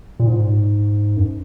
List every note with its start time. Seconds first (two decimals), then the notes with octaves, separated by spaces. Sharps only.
0.20 A#2
0.27 G#2
1.17 F#2